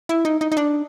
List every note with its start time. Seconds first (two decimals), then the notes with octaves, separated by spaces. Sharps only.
0.09 E4
0.25 D#4
0.41 D#4
0.52 D#4
0.57 D4